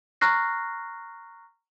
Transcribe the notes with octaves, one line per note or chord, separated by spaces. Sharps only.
A#5 C#6 F6 F#6 A#6 C7